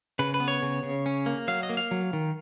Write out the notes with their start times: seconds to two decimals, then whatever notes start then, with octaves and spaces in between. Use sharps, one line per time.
0.19 C#3 B4
0.34 B4
0.40 B3
0.48 C#5
0.62 C#3
0.83 C#3
1.06 C#4
1.26 A#3
1.48 F#3 F5
1.63 D#5
1.69 A#3
1.77 F5
1.91 F#3
2.13 D#3